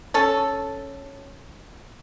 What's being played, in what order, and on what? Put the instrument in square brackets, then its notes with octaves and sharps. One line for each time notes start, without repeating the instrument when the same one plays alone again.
[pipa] C#4 A4